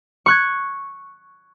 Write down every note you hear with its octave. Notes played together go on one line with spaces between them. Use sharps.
C#6 F#6 G#6